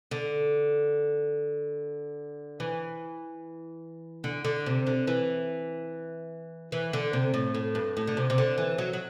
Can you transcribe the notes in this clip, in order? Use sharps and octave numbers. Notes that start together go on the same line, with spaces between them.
D3
E3
D3
D3
C3
D3
E3
E3
D3
C3
A2
A2
G2
A2
D3
C3
C3
D3
E3
F#3
F#3